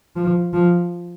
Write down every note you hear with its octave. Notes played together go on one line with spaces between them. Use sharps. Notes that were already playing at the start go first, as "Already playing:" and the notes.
F3
F3